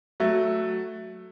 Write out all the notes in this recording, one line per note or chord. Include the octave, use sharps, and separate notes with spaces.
F#3 A3